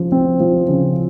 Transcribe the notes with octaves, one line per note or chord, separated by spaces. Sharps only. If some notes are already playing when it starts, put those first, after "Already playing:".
Already playing: C#3 F3
C4
F3
C#3